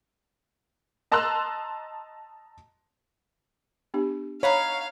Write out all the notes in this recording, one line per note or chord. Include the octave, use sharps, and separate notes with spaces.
D#5 A5 A#5 C6 E6 F#6
B3 D4 G4
D#4 C#5 F5 F#5 B5